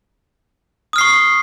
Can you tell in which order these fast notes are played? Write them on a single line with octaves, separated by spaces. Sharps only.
D#6 F6 C7 C#6